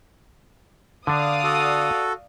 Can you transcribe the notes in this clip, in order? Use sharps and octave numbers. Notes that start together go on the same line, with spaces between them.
D3 D4 D5 F5 D#6
F#4 A4